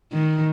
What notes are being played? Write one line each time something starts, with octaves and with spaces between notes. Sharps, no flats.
D#3